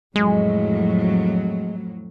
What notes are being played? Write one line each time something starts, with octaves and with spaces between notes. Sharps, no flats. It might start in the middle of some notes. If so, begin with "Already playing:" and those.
F2 A2 F#3 G#3